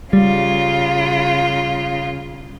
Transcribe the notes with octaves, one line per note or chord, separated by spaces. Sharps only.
C#3 G3 F4